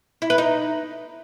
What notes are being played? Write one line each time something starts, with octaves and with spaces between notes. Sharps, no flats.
E4
B4
D#4